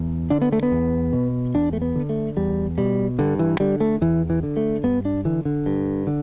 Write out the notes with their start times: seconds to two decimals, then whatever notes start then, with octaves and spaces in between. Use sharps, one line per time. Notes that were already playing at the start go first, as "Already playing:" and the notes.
Already playing: E2
0.30 D3 D4
0.42 B3
0.52 A3
0.63 B3
0.72 E2
1.13 B2
1.54 E2 D4
1.73 A3
1.82 B3
1.95 D3
2.09 A3
2.37 E2 G3
2.78 B2 G3
3.19 G2 D3
3.39 E3
3.60 D3 G3
3.80 A3
4.01 E2 E3
4.30 E3
4.43 D3
4.57 A3
4.84 G2 B3
5.05 D4
5.25 D3 E3
5.45 D3
5.66 G2
6.07 D3